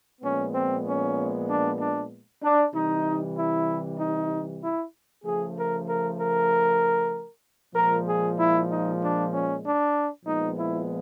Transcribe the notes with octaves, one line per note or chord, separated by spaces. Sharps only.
A#2 F3 G#3 B3 C#4
C4
C#4
D4
D4
D4
C3 E3 G3 D#4
E4
D#4
E4
C#3 F3 A3 G#4
A#4
A#4
A#4
A#2 F3 G#3 A#4
G#4
E4
D#4
D4
C#4
D4
A#2 F3 G#3 B3 D#4
E4